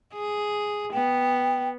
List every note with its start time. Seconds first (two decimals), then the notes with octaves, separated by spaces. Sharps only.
0.13 G#4
0.92 B3 G5